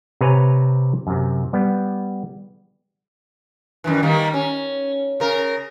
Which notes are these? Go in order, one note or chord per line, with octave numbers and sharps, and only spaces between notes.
C3 B4 C#5 G#5 A#5
F#2 C3
G3 B3
F#2 D#3 E3
D#3 G3 A#3
C#4
C#3 A#4